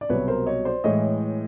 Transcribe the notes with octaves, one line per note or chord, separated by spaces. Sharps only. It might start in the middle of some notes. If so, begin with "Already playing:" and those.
D5
C2 B2 F#3 B4 C#5
A#4 C5
C#5 D#5
C5 D5
A2 E3 G#3 C#5 D#5